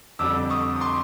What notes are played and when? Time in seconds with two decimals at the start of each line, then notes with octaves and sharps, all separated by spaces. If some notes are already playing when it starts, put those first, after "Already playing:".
0.19 F2 D3 G3 D6 E6
0.50 C#6 D#6
0.76 D#6
0.81 C6 D6